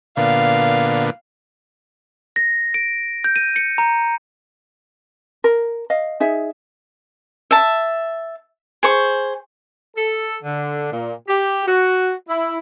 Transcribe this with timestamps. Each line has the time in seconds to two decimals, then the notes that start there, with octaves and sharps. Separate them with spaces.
0.17 A#2 D3 B3 F5
2.36 A#6
2.74 D7
3.24 G6
3.36 D#7
3.56 C#7
3.78 A#5
5.44 A#4
5.90 D#5 F5
6.20 D#4 G#4 E5
7.51 E5 A5
8.83 G#4 C5 C#6
9.96 A4
10.43 D3
10.93 A#2
11.27 G4
11.65 F#4
12.28 E4